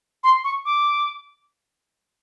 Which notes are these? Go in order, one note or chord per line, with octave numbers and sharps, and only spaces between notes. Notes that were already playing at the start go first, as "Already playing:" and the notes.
C6
C#6
D6